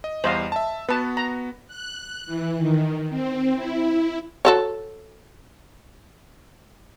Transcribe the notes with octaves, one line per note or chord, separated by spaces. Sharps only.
D#5
E2 G3 C5 D#5 F5
E5 A5
B3 F#4 B4 A5
A#5
F#6
E3
D#3
C4
E4
F#4 A4 C#5